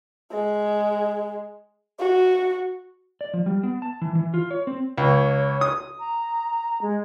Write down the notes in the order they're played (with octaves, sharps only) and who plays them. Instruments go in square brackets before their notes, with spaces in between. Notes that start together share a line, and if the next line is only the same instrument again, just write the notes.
[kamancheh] G#3
F#4
[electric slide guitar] D5
F3
G3
B3
A5
E3
E3
F4
C#5
C4
[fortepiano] C#2 [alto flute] C#5
[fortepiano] D#6
[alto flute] A#5
G#3